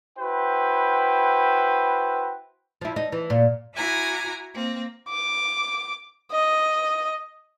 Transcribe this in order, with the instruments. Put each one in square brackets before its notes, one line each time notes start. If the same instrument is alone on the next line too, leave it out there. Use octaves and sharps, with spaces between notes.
[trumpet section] E4 F#4 B4 C5 G5
[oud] F3 E4
D#4
E3
A#2
[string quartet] E4 F#4 G#5 A#5 D6
A#3 C4
[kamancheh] D6
D#5